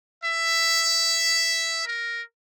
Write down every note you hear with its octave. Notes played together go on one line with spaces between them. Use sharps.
E5
A#4